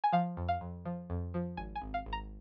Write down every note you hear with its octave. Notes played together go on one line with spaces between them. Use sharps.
G#5
F3 F5
F2
F5
F2
F3
F2
F3
G#1 G#5
G#5
G#1
F5
G#1
A#5